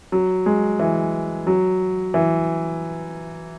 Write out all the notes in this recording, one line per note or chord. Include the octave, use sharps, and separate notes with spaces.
F#3
G#3
E3
F#3
E3